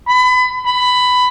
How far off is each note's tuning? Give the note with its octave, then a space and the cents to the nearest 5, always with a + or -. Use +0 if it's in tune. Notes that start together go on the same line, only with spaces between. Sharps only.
B5 +30
B5 +10